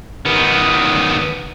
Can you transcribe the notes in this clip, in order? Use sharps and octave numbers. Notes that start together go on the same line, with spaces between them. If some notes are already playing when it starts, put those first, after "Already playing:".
D#3 B3